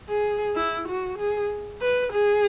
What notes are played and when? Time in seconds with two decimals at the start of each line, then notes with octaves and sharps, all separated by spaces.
0.09 G#4
0.56 E4
0.88 F#4
1.19 G#4
1.82 B4
2.13 G#4